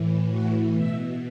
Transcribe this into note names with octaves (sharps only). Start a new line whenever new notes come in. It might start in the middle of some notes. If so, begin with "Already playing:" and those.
Already playing: A2 E3
F#4
B2 E5